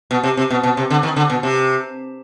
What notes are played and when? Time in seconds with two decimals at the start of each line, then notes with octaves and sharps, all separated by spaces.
0.11 B2
0.23 C3
0.37 C3
0.50 B2
0.63 B2
0.77 C3
0.90 D3
1.03 D#3
1.16 D3
1.30 B2
1.43 C3